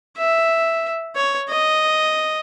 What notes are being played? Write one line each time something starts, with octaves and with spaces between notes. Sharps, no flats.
E5
C#5
D#5